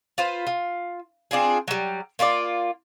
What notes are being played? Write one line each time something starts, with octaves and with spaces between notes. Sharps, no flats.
F4 B4 C5
F4
C4 D4 F4 G#4
F#3 G3
A#3 F4 F#4 D5